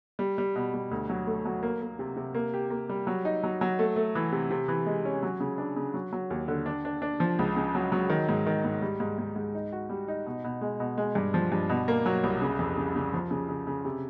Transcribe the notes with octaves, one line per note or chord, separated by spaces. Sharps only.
G3
G3
B2
G3
D2
F#3
A3
F#3
A#3
A#3
C3
C3
A#3
G4
A#3
G3
F#3
D#4
F#3
F#3
A3
A3
E3
C3
C3
E3
G#3
C#4
F#3
C#3
D4
C#3
F#3
F#3
D#2
D3
D4
D4
D4
F3
C#2
C#3
F#3
F#3
D#3
G#2
D#3
G#2
G3
G#2
G#2
G#2
D#4
F#4
G3
D#4
B2
B2
G#3
B2
G#3
G2
F3
G2
B2
A#3
F#3
C2
C#3
F2
C#3
C#3
F3
C#3
C#3
C#3
C3